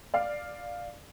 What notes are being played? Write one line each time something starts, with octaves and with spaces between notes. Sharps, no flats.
D5 F5